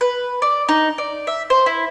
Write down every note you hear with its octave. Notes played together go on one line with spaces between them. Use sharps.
B4
D5
D#4
D5
E5
C5
E4